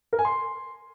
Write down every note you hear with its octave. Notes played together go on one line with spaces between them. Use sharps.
A#4
G#5
C6